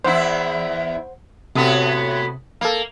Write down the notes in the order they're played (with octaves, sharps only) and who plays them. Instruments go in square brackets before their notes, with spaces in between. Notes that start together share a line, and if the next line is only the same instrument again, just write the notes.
[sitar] E2 E4 [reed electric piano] C5 F#5
[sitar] A2 B3 F#4 [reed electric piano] C3 D#6
[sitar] A#3 [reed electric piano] A4 F5